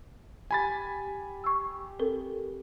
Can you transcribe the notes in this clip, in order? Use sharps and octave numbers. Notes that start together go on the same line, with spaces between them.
G4 G#5 B5 A6
C#6 E6
C4 A4 A#4